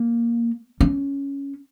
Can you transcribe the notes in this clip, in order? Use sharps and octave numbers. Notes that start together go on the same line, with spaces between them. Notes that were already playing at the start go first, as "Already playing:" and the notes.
Already playing: A#3
C#4